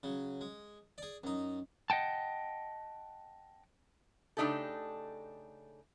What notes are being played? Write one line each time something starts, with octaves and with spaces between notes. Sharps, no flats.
C#3 F#3
G#3
G#4 D5
F#2 D#4
D#5 F#5 G5 A5
C#3 A3 D4 D#4 G4 A4